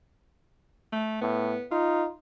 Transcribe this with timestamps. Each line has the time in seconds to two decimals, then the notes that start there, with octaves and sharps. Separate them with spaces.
0.93 A3
1.22 A2 B3
1.72 D#4 F4